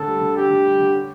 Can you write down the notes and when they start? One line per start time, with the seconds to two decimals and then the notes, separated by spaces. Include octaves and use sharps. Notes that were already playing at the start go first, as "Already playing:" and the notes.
Already playing: D3 C#4 D4 A4
0.08 G3
0.21 D3
0.36 D4 G4
0.50 D3
0.65 G3
0.80 D3
0.94 C#4